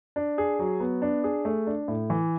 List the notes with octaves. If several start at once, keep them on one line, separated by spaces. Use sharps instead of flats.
D4
G#4
F#3
B3
D4
G#4
A3
D4
A2
E3